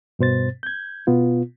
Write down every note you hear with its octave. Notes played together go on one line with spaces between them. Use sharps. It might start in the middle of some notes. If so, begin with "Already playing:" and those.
G2 B2 C5 A6
G6 G#6
B2 B3 F4